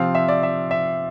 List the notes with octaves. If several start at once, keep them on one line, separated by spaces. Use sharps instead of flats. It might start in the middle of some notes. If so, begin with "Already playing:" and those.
Already playing: C3 F3 C4 F5
E5
D5
E5
E5